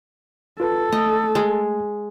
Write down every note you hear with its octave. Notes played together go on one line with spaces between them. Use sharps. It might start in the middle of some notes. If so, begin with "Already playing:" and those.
F4 A4 B4
A3 D#5
G#3